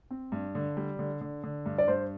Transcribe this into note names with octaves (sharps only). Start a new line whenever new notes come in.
C4
G2
D3
G3
D3
D3
D3
G2
D5
G2 C5